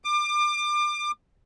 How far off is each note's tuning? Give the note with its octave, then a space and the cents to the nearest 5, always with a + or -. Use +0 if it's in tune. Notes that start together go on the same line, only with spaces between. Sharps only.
D6 +30